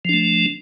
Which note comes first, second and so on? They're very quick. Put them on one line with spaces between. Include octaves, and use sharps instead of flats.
F3 D4 A3